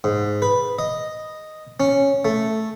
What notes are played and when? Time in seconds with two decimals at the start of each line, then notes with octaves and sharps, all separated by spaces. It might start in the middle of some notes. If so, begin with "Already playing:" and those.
0.04 G#2
0.42 B4
0.79 D#5
1.80 C#4
2.25 A3